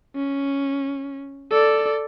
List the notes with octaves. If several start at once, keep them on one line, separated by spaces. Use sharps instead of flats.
C#4
A4 D5